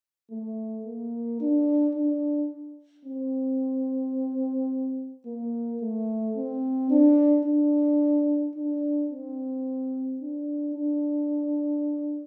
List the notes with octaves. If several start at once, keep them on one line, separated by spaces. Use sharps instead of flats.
A3
A#3
D4
D4
C4
A#3
A3
C4
D4
D4
D4
C4
D4
D4